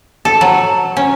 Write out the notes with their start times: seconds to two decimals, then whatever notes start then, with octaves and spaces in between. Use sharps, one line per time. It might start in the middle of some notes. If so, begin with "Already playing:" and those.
0.25 A4
0.41 F#3
0.97 C#4